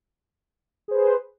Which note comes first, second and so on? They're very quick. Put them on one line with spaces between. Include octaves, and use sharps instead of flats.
G#4 C5 B4